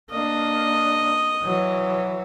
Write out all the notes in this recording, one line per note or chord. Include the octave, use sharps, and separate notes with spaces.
A#3 D4 D#5
E3 F#3